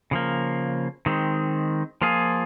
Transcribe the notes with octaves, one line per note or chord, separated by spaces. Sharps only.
C#3 F3 A#3
D#3 G#3 C4
F3 A#3 F4 G#4